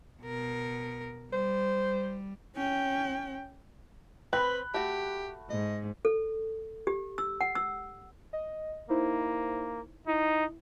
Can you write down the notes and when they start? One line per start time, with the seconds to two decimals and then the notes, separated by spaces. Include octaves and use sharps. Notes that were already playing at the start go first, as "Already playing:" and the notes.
0.23 B2 A#4
1.33 G3 C5
2.56 C#4 G5
4.33 C4 B4 B5 F#6
4.74 A3 F#4 G4
5.50 G#2 D#5
6.05 A4
6.87 G4
7.18 E6
7.41 F#5
7.55 E6
8.33 D#5
8.90 A#3 D#4 E4 C5
10.07 D#4 E4